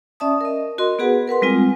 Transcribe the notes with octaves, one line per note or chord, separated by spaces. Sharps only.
C#4 D5 E5 A5 D#6
A#4 D#5
F#4 A#4 D#5 C6
B3 F#4 G#4 B4 F#5
A#4 B4 F#5 C6
G3 G#3 C4 F4 G#5